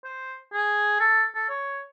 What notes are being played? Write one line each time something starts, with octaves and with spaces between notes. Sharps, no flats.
C5
G#4
A4
A4
C#5